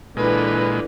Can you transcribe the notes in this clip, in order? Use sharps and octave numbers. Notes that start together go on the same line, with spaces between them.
A#2 D3 E3 G#3 B4